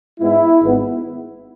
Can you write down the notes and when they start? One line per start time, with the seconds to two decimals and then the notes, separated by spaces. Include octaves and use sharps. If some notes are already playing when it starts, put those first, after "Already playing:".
0.20 G#2 G#3 B3 E4
0.61 G#1 G#2 G#3 B3